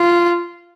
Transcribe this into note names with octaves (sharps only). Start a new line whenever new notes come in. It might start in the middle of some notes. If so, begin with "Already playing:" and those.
Already playing: F4